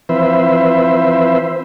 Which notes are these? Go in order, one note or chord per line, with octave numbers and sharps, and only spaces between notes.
E3 F3 C4 B4 C5 E5